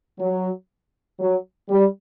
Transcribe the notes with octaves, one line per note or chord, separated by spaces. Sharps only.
F#3
F#3
G3